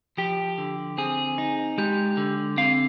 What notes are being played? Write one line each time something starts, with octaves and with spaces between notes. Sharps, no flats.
F3 G4
D3
C4 G#4
D#4
G#3 G4
D3
C4 F5